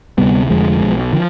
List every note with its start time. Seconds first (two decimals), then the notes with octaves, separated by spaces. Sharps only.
0.18 D2 C3 G3 B3
0.49 F1 F2 D3 F3 G#3
0.81 B1 B2
1.13 D3 F3